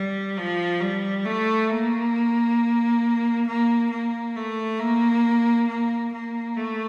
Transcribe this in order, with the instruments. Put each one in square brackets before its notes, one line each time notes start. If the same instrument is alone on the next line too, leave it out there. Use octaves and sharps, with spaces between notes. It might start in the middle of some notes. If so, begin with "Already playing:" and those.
Already playing: [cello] G3
F3
G3
A3
A#3
A#3
A#3
A3
A#3
A#3
A#3
A3